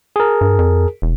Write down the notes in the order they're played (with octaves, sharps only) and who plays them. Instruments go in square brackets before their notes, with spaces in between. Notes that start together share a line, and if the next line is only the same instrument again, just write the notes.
[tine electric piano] G#4 A#4
[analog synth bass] G2
F2
E1